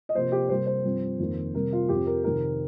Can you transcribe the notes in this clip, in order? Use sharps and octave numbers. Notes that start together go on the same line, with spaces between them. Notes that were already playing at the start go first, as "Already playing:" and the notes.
D#5
C3 F3 A#3 C5
G4
C3 G3 A#3 C5
C5
G2 F3 C4
F2 D#3 A#3
C3 G3 C4 A#4
F4
F2 F3 C4 G4
A#4
F2 C3 D#3 C4 A#4